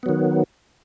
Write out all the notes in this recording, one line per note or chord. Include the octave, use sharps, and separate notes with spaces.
D#3 F#3 B3